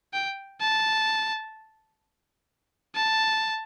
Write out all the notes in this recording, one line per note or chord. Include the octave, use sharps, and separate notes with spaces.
G5
A5
A5